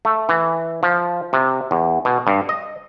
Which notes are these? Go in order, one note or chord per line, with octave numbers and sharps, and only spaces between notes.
A3
E3
F3
C3
E2
B2
G2
D#5